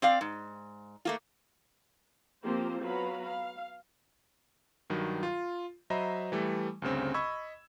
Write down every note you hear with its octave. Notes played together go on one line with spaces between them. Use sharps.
C4 D5 F5
G#2
A3 A#3 F4
F3 A#3 C4 F4 G4 C5
F#3 B3 B4 F5 A#5 B5
F5
G2 D#3 F#3
F4
F#3 C5 D#5 E5 A#5 B5
E3 G3 A3
D2 G2 C#3 C4
D#5 B5 C#6 E6 G#6